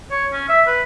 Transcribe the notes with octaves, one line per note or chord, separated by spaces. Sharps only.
C#5
C#4
E5
B4